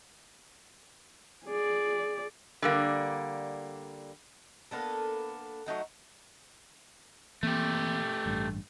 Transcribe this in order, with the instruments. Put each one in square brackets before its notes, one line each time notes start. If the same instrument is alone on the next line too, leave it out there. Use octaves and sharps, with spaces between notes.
[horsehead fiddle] G#4 D5
[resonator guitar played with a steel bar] D3 G3 A#3
[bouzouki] A#3 B3 D4 A4
F#3 A3 D#4 F#5
[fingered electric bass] E3 A#3 C4 [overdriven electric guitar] A3 G4
[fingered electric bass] A1 G2